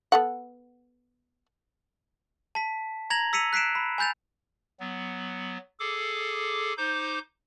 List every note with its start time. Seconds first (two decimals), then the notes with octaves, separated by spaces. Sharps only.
0.12 B3 A4 F#5
2.55 A5 B6
3.10 A#5 G#6 A#6 F7 F#7
3.33 E6 B6 C#7 D#7 F7
3.53 F#6 B6 C7 D7 E7
3.75 B5
3.98 G#5 B5 G6 A6 F7
4.80 F#3 B3
5.80 G#4 A4 D6
6.78 D#4 C5 D6 G6